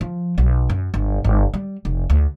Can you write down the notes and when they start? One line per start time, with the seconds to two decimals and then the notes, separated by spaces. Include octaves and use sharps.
0.01 F3
0.38 B1
0.70 F#2
0.94 G1
1.24 G1
1.54 G3
1.85 F1
2.10 D2